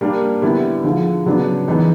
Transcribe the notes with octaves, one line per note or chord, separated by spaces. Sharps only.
G3 A#3 D4
D3 G3 B3 E4
D3 F3 G#3
C#3 F#3 B3 D4
E3 G#3 B3 D#4 G#4